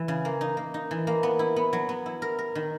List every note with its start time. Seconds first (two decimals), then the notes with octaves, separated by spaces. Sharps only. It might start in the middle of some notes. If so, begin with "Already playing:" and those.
Already playing: E3
0.08 C#3
0.25 A#3
0.41 D#4
0.57 A#3
0.74 D#4
0.91 E3
1.07 A#3
1.23 B3
1.39 E4
1.56 B3
1.73 F#3
1.89 B3
2.06 E4
2.22 A#4
2.39 A#4
2.55 D#3